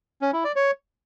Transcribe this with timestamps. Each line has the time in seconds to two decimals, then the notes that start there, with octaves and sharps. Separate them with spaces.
0.22 C#4
0.33 E4
0.44 D5
0.56 C#5